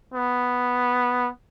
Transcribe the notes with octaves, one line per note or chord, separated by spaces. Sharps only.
B3